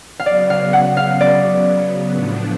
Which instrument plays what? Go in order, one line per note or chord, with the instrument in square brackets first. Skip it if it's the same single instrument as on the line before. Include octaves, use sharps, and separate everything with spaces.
[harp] F5
[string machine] C#3 F#3 B3 [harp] D5
[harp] F5
F#5
F5
D5
[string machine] A2 F3 B3 D4